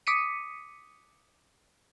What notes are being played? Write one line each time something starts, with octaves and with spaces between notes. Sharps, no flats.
D6 D#6 B6 C#7 D#7